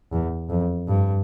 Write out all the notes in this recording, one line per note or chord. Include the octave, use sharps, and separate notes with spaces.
E2
F2
G2